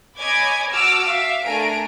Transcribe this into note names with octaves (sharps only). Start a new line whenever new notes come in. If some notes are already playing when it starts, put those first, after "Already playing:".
C#5 D#5 G#5 B5 D6 G#6
F#4 A5 D6 E6 F6
E5 F5
A3 D4 A#4 G#5 A#5 D7